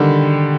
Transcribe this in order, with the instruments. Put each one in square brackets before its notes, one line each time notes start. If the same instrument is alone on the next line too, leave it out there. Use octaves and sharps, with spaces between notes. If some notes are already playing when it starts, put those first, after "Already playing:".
Already playing: [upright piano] D3 D#3 G3